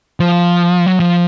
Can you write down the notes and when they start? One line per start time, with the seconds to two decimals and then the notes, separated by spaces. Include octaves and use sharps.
0.20 F3
0.86 F#3
1.00 F3